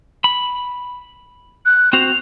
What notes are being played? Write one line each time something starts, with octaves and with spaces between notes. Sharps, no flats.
B5
F#6
C4 F#4 C5 F7